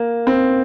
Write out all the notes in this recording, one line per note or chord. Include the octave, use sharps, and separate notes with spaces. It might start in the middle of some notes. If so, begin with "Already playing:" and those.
Already playing: A#3
C4